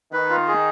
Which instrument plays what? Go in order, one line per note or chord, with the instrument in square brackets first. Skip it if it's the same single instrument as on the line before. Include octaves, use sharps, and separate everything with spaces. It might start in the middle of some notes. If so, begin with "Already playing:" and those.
[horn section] D#3 [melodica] B4
[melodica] F4
G#4